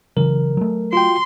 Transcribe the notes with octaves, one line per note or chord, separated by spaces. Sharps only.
C#3 E3 F#3 A#4
F#3 A3
F4 F#4 G5 C6